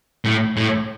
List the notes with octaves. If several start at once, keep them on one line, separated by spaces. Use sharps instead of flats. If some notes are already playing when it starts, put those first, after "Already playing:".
A2
A2